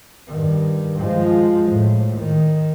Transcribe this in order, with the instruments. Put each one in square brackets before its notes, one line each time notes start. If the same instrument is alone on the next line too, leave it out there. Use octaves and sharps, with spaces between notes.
[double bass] G2 D#3
F3 G#3
A2
D#3